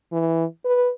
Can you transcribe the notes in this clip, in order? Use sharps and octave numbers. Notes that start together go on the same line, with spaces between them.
E3
B4